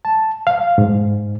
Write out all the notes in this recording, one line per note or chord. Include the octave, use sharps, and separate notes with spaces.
A5
F5
G#2